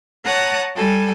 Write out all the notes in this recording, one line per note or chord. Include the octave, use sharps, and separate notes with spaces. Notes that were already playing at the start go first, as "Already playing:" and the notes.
C#5 F#5 A5 A#5 D#6 F#6
G3 A4 G#5